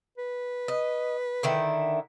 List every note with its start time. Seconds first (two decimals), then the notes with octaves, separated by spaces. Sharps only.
0.18 B4
0.68 D#5
1.43 D3 D#3 E4